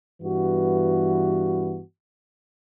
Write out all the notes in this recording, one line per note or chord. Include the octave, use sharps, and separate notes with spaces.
G2 E3 B3 F#4